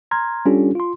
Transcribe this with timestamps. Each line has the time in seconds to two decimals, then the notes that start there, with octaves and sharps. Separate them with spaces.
0.11 A#5 C6 F6 G#6
0.45 G3 C#4 D4 F4 G4 A4
0.75 F4 C6